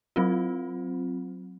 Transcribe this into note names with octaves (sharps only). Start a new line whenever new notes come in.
F#3 C4 F4